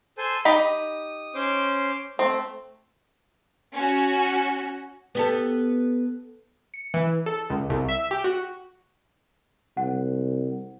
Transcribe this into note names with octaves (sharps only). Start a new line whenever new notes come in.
A4 C5 G#5
D#4 G4 B5 D#6
C#4 C5 D6
A3 C4
C#4 F#4
B3 G4 A4
C#7
E3
A4
C#2
C2
E5
G4
F#4
C2 F#5